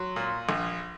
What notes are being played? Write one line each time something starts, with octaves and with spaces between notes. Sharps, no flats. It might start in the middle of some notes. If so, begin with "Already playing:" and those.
Already playing: F#3 C6
A#2
A#1